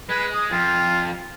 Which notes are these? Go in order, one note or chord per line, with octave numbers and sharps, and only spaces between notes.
G#3 B4
D#6
F2 F4